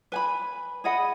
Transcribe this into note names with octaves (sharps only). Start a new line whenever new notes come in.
B4 G#5 B5
G#4 D#5 F#5 B5